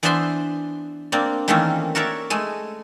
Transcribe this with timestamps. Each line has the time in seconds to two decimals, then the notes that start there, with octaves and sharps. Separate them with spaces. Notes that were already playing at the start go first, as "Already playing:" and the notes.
0.03 E3 B3 D4 C5 E5 C6
1.12 A#3 C4 D4 D5
1.48 D#3 E3 A3 A#3 C4 C#4
1.95 F#4 A#4 C#5 D5 E5
2.30 G#3 A3 G#5